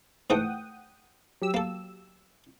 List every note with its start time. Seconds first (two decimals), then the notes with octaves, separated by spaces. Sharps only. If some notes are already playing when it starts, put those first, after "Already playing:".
0.30 G#2 E3 A3 F#5 G5 D#6
1.42 F#3 G4 E6
1.54 A#3 A4